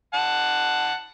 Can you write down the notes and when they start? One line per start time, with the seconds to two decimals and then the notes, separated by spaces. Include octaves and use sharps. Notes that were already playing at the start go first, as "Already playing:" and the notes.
0.14 F#5 A5